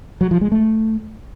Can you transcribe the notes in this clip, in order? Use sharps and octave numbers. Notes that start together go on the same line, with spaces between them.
F#3
F3
G#3
A3